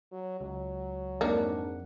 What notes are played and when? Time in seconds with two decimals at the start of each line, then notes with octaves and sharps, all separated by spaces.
0.12 F#3
0.41 C#2 F#3
1.21 F2 G#2 A#3 D4 F#5